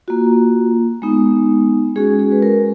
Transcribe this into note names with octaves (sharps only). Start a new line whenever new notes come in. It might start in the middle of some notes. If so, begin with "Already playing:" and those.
A#3 F4 F#4
G#3 B3 D#4
G#3 C#4 F#4 G#4
G#4
B4
A#4